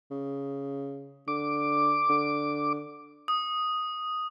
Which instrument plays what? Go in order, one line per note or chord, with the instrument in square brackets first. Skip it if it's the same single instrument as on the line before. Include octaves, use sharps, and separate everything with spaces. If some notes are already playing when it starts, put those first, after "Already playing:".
[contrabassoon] C#3
[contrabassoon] D3 [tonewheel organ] D6
[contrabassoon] D3
[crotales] D#6